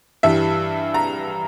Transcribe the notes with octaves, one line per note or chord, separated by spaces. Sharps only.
G2 E3 G3 E5
A#5